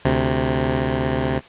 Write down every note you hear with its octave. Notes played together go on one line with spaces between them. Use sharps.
D2 C3